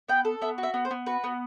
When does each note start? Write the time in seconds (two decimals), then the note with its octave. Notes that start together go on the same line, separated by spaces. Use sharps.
0.09 B3 G5
0.25 A4
0.42 B3 E5
0.58 F#4
0.63 E5
0.74 B3
0.85 C5
0.91 B3
1.06 F#4 B4
1.24 B3